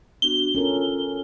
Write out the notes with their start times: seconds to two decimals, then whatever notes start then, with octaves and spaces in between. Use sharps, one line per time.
0.22 B3 D4 F#4 G7
0.55 C#4 F4 A4 A#4